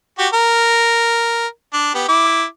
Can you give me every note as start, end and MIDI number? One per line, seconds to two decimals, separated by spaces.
0.19 0.28 66
0.19 0.28 67
0.34 1.46 70
1.73 1.92 62
1.95 2.07 59
1.95 2.07 67
2.08 2.45 64
2.08 2.45 86